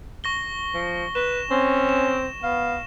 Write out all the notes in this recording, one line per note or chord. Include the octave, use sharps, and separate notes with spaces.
C#6 A#6 G7
F3
B4 E7
C4 C#4
E7
B3 F5